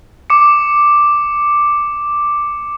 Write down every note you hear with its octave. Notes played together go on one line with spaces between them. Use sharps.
D6 C#7